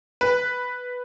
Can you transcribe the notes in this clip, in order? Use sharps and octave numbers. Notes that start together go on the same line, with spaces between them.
B4